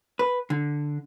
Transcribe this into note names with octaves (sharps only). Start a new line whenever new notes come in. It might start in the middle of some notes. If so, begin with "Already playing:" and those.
B4
D3